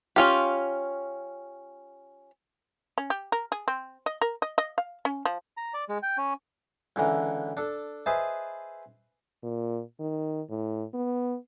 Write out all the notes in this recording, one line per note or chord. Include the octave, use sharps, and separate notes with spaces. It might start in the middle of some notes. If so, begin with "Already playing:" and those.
C#4 F4 G4
C#4
G4
A#4
G#4
C4
D#5
A#4
D#5
D#5
F5
C#4
F3
A#5
D5
G#3
G5
C#4
C#2 D3 E3 A#5
D4 A4
G#4 B4 C5 D#5 E5 A5
A#2
D#3
A2
B3